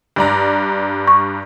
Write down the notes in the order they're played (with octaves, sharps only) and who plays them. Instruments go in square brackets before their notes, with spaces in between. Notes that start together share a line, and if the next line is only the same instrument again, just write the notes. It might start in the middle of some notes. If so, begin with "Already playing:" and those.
[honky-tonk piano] G2 D5 A#5
[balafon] C#6